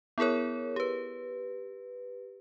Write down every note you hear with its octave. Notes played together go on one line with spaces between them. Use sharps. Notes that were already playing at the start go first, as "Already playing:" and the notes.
B3 E4 G#4 A#4 C#5
G4 B4